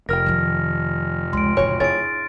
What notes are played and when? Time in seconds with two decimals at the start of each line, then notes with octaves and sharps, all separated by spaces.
0.09 F1 A#4 G5 F6 A#6
0.26 D#3 F3
1.33 C#2 C6 D7
1.57 A1 C#3 E3 F#4 C#5
1.80 D4 E4 G#4 C#5 A6 D7